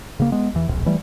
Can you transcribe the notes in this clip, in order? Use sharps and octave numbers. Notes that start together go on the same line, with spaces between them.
C#3 A#3
G#3 B3
E2 E3
D1 A#1
E3 G3 A3